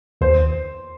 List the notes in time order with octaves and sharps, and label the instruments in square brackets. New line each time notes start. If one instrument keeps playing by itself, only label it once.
[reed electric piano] D#2 [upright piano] C5